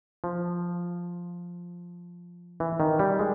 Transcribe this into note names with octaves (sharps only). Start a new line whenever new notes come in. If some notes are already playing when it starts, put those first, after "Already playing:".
F3
E3
D#3
G3
G#3